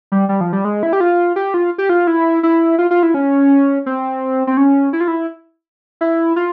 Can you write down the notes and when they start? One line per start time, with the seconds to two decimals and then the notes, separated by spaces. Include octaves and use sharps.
0.12 G3
0.29 G3
0.41 F3
0.53 G3
0.65 G#3
0.83 E4
0.93 G4
1.00 F4
1.36 G4
1.54 F4
1.78 G4
1.89 F4
2.07 E4
2.43 E4
2.79 F4
2.91 F4
3.03 E4
3.14 C#4
3.86 C4
4.47 C4
4.57 C#4
4.93 E4
5.00 F4
5.08 E4
6.01 E4
6.36 F4